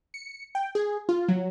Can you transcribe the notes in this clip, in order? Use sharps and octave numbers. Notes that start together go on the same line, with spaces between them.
C#7
G5
G#4
F4
F#3